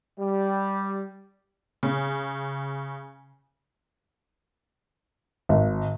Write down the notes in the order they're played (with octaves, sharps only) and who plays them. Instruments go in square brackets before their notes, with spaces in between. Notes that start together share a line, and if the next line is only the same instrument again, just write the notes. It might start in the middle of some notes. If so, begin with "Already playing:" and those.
[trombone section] G3
[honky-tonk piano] C#3
[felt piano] G#1